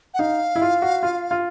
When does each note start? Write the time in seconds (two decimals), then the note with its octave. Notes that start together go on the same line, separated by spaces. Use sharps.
0.14 F#5
0.19 D#4 F5
0.56 E4
0.62 F4
0.82 F#4
1.03 F4
1.31 F4